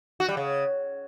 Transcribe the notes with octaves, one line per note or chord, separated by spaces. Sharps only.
F#4
G3
C#3